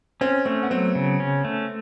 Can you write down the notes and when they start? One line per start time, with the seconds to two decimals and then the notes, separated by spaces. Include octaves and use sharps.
0.21 C4 C#4
0.45 A3 C4
0.63 B3
0.70 F#3 C4
0.95 C#3
1.20 C#4
1.45 A3